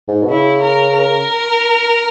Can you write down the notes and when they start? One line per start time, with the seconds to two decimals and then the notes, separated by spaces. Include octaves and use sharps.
0.08 G#2
0.22 B2
0.30 C#3 E4
0.61 A#4
0.93 A#4